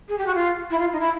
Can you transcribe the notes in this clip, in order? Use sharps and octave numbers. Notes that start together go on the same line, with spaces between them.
G#4
G4
F#4
F4
E4
F4
D#4
E4